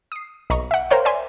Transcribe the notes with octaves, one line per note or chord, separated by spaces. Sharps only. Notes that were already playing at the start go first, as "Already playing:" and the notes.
D#6 C7
B1 D#5 A#5 C#6
E5 F#5
A#4 C5 C#5 F5 G5 C6
D5 E5 G#5 C6